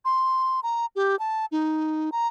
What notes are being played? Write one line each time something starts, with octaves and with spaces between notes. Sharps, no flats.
C6
A#5
G4
A5
D#4
A#5